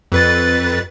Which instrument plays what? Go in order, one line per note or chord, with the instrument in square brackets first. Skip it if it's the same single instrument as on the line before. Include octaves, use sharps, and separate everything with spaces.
[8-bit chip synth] F2 B4 A6